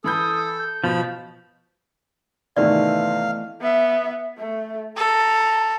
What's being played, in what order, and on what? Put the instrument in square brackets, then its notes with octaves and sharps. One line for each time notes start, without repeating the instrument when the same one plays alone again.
[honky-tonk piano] E3 B5 G6 [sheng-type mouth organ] A4 [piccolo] D#6
[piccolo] G6
[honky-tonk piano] B2 [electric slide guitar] F3 [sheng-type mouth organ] B5
[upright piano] G#2 C3 D#3 [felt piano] E3 A3 B3 [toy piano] D5 [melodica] F5
[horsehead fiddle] B3 E5
A3
[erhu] A4 [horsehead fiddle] A#5